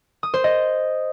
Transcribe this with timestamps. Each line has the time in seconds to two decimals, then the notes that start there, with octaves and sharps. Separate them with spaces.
0.23 D#6
0.34 C5
0.44 D#5